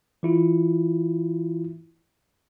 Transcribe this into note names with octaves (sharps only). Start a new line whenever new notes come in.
E3 E4 F4